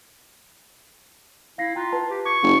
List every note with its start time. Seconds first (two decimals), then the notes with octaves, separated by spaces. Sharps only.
1.58 E4 F5 A#6 C7
1.75 F4 G5 A#5 F#6
1.92 B4 G5 A5
2.10 G4
2.25 C#6 D6 G#6
2.43 F#1